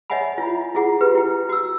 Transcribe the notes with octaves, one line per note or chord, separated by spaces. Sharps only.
C#5 D#5 E5 F#5 G#5 B5
E4 F4
E4 F4 G#4 F#5
F4 G4 B4
E4 G5
F#4 E6